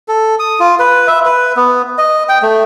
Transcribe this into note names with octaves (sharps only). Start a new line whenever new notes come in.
A4
D#6
F4
B4
E5
B4
B3
D#5
G5
A3